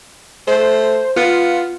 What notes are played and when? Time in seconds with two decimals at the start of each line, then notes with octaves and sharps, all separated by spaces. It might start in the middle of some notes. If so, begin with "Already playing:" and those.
0.47 A3 C5
1.16 B3 F4